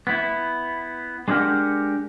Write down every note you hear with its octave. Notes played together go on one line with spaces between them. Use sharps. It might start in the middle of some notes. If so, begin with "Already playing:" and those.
B3 E4
G#3 D4 E4 G4 A#4 F#5